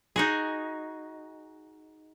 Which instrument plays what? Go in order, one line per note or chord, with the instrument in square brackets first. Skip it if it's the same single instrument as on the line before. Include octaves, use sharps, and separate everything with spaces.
[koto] D#4 F#4 G#4